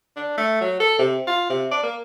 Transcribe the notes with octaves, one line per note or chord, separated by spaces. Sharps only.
D4
A3
F#3
A4
C3
F4
C3
D5
A#3